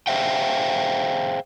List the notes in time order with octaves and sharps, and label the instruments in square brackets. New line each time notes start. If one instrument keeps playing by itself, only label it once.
[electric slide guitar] G#4 C5 E5 F5 G5